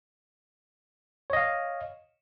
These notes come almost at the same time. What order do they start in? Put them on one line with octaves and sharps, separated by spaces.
C#5 D#5 F5